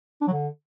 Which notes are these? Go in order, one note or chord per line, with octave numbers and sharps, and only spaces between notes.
D4
F#3
D3